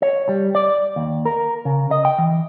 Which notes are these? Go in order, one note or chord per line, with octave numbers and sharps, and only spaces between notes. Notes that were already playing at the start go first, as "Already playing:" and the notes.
C#5
G3
D5
D#2
A#4
C#3
D#5
G5
E3